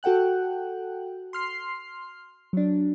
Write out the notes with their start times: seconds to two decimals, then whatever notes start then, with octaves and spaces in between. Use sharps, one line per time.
0.03 F#4 A4 F#5 G5 F#6
1.33 C6 F6 C7
2.53 F#3 D4